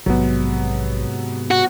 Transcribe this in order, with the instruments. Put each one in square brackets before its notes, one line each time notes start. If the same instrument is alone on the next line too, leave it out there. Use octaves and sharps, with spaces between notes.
[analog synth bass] A#1 [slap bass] G#2 C3 [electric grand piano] F#3 B3
[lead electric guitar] F#4